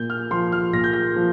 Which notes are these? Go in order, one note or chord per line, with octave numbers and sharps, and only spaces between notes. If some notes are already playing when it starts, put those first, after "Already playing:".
Already playing: A#2 G6
F6
F3 C6
F6
A#2 A#6
G6
A#6
F3